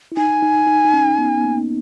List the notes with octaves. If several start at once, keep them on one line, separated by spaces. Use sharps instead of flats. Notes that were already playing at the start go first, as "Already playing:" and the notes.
E4
D#4 G#5
D#4
D#4
D#4
C#4
B3
B3
A#3